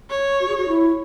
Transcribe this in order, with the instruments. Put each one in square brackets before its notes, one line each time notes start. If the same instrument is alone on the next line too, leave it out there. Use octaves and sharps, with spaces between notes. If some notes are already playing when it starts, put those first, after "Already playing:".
[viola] C#5
[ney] F#4
G#4
F#4
E4